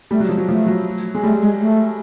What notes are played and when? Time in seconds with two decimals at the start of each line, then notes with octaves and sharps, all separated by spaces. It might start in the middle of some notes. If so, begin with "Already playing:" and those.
0.11 G3 A3
0.20 F#3
0.29 F3 G#3
0.38 F#3
0.48 F3 A3
0.67 F#3
1.15 G#3
1.23 G3 A3
1.42 G#3
1.60 A3